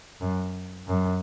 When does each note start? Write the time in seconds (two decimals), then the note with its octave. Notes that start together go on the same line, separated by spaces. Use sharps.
0.21 F#2
0.87 F#2